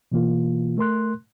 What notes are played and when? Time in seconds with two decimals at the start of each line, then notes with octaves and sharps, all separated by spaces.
0.12 B2 E3 A#3 F4
0.78 A3 A#4 C6 F#6